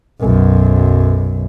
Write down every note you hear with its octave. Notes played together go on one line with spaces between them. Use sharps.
B1 F#2